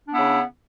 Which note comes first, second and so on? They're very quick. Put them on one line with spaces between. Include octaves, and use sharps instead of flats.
D4 B3 E4 C#3